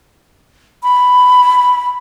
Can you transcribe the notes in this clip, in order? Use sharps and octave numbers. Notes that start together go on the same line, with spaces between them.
B5